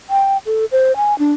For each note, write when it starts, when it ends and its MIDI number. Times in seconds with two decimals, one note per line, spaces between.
0.10 0.37 79
0.46 0.65 69
0.72 0.95 72
0.97 1.17 80
1.19 1.33 62